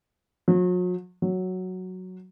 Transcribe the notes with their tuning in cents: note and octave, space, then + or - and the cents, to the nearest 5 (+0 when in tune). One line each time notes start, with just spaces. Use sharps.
F#3 -40
F#3 +0